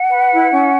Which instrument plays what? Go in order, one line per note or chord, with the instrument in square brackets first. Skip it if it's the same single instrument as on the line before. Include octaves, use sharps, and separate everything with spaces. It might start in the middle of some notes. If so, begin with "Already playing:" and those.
Already playing: [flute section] F#5
B4
E4
C#4